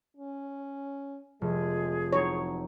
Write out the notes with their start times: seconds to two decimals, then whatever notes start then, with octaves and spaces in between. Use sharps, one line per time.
0.17 C#4
1.42 F1 G#3 G#4
2.13 F#3 C4 D#4 C#5